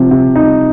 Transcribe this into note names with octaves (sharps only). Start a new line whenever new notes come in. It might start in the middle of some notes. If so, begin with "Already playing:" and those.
Already playing: C3 F3
C3
D#4